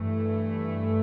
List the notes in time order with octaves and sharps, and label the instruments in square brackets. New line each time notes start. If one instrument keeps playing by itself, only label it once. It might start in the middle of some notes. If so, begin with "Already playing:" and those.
Already playing: [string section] G2 E3 A3